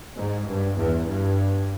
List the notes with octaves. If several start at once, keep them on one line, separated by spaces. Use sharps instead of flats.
G#2
G2
E2
G2